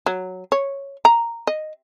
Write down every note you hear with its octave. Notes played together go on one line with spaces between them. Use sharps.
F#3
C#5
A#5
D#5